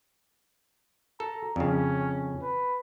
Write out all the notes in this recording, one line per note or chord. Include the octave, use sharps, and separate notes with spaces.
A4 A#5
F2 C#3 C#4
B4